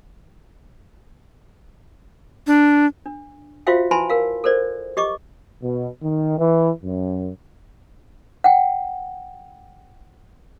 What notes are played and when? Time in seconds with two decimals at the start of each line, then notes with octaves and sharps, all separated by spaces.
2.47 D4
3.06 D4
3.67 F4 F#4 C5 E5 F5 G5
3.91 E4 B4 G#5 A5 B5 C6
4.10 A#4 F5
4.44 A4 A#4 C5 D5
4.97 G4 D#5 C#6 D6
5.62 B2
6.03 D#3
6.38 E3
6.84 F#2
8.44 F#5 G5